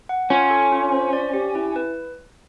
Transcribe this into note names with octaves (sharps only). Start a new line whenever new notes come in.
F#5
C#4 F4
A4
F4
C5
D5
G4
E4
B4